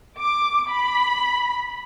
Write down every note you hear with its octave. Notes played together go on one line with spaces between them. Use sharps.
D6
B5